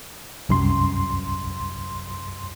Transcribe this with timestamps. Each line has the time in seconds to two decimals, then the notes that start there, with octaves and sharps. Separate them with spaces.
0.49 C2 F#2 C6